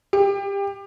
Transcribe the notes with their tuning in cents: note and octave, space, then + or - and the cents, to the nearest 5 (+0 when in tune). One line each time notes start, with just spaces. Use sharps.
G4 +25